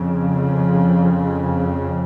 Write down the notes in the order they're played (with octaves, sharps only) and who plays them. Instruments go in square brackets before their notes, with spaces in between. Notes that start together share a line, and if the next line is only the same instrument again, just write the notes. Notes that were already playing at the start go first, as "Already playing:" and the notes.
Already playing: [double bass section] F2 C#3
F3